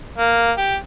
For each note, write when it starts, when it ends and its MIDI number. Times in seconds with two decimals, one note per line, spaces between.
0.18 0.52 58
0.57 0.76 67